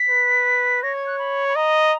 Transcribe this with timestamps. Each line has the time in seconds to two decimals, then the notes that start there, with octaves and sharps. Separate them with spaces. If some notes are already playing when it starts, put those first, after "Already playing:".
Already playing: B6
0.09 B4
0.83 C#5 A#6
0.95 G#6
1.07 F#6
1.19 B5
1.49 B5
1.56 D#5 A#5